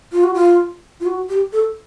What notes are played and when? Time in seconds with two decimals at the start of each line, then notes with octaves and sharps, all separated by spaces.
0.12 F4
0.24 F#4
0.34 F4
1.00 F4
1.06 F#4
1.29 G4
1.53 A4